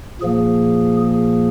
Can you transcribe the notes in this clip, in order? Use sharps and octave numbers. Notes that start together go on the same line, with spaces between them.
A#2 F3 A#3 G#4
G#4